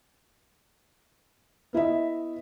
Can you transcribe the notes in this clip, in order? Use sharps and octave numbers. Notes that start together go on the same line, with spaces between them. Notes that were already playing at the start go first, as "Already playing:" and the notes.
B3 E4 D#5 E5